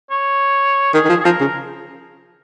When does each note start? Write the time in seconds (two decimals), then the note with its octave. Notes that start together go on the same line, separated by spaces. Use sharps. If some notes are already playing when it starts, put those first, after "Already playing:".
0.10 C#5
0.94 D#3 G#4
1.05 D#3
1.09 F3
1.20 G#4
1.25 F3 A#4
1.41 C#3